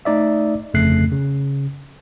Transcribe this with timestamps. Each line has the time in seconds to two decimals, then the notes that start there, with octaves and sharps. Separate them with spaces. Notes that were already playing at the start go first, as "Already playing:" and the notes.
0.05 A3 D#4 D5 E5
0.74 G1 F2 C#3 A3 F#6 C7
1.12 C#3